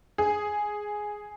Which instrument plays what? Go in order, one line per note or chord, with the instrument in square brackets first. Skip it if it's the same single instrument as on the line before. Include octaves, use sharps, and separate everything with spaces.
[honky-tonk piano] G#4